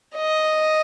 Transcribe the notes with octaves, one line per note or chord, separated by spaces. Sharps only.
D#5